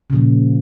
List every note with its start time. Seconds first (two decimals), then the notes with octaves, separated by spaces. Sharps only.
0.10 C#3
0.13 A#2
0.15 F3